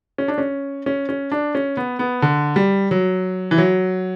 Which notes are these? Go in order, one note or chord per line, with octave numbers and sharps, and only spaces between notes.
C#4
D4
C#4
C#4
C#4
D4
C#4
B3
B3
D3
G3
F#3
E3
F#3